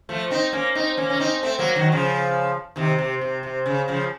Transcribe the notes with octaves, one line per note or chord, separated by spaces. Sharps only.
F3 A3
C4 D#4
A#3 C#4
C4 D#4
A#3 C#4
C#4
C4 D#4
A3 C4
F#3 A#3
D#3 F#3
C#3 F3
C3 D#3
C3
C3
C3
C#3
C#3 F3